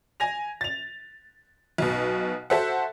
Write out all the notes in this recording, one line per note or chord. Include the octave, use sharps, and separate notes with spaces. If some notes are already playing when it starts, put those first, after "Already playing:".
G#5 A#6 F7
A6 F7
B1 B2
F#4 A4 C5 E5 F#5